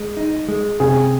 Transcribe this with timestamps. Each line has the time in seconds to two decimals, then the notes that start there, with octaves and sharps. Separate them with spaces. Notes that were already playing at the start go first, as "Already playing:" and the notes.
Already playing: G#3
0.17 D#4
0.48 G#3
0.80 C3 G#4